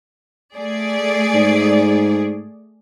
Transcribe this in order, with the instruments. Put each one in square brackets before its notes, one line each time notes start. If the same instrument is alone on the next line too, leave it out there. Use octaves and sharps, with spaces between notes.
[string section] A3 G#4 D5
[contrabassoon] G#2